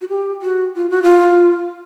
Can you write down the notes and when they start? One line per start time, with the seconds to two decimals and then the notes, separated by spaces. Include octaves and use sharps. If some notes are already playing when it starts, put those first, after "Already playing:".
0.01 F#4
0.09 G4
0.42 F#4
0.76 F4
0.90 F#4
1.03 F4